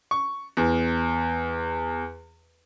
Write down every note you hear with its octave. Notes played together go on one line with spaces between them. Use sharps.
C#6
E2